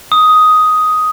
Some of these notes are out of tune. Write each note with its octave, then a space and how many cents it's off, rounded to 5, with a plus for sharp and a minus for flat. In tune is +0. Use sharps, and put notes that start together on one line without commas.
D#6 +5